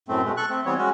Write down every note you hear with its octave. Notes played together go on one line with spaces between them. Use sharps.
F#2 A2 A3 C4
B2 G#3 A3
A4 C#6 F#6
A3 C4
E3 G3 B3 C4 C#5
G#3 C#4 F#4